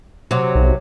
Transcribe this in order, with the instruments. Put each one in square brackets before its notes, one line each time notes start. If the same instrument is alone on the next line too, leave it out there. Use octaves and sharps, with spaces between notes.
[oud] C3 F#3
[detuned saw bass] B1